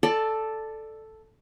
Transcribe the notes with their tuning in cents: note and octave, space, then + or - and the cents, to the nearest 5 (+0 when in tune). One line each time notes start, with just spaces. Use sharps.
A4 +0 D5 +15